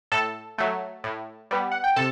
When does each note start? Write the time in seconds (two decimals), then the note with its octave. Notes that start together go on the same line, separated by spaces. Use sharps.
0.12 A2 A4 A5
0.58 F#3 A3
1.04 A2
1.51 G3 B3
1.72 F#5
1.84 G5
1.96 C3 A4 A5